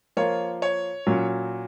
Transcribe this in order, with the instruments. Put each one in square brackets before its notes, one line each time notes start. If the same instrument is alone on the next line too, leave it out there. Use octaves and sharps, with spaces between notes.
[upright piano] F3 A#3 F4 [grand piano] C#5
[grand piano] C#5
[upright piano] A#2 F#3 C#4 F#4